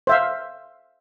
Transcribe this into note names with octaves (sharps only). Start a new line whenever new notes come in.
C5 E5 F5